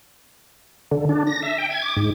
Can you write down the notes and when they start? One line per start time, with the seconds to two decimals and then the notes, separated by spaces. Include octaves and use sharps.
0.91 D3
1.09 D4
1.27 A#6
1.42 E5
1.58 G5
1.70 G#6
1.82 D6
1.97 G#2